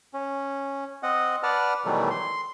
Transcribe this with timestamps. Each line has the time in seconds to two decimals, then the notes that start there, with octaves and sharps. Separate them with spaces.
0.14 C#4
1.03 C4 D#5 F#5
1.43 B4 D5 F#5 A5 F6
1.85 B2 D#3 E3 F#3 G3 A3
2.10 C6